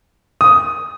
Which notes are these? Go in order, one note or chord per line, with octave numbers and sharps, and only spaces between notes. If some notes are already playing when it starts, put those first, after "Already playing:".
D#6